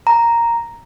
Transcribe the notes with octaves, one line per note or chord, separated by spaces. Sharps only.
A#5